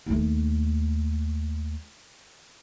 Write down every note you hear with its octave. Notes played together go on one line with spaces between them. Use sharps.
D#2 A3